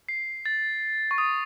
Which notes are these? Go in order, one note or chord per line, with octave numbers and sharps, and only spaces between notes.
C7
A6
C#6
D#6